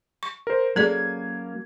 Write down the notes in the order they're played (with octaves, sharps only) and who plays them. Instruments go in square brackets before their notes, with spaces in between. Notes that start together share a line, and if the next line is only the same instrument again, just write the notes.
[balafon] C#6
[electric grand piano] A#4 C5
[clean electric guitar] F#3 A#3 C#4 [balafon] G#4 A4 D5 [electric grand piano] G#6